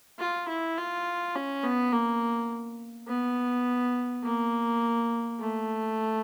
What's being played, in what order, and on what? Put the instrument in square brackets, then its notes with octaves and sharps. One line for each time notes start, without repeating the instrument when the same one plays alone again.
[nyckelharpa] F4
E4
F4
C#4
B3
A#3
B3
A#3
A3